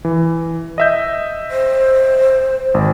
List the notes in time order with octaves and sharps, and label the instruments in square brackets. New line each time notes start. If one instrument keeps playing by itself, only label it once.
[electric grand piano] E3
D#5 E5 G6
[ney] C5
[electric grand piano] G#1